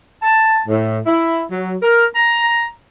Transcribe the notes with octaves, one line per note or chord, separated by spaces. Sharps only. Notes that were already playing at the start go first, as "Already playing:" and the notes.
A5
A2
E4
F#3
A#4
A#5